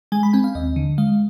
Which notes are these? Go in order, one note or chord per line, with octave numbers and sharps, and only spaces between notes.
G#3 G#5
B5
C4 G#5
F5
D#2 D#5
D3
G#3 F5